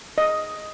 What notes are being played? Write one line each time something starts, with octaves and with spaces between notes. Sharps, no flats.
D#5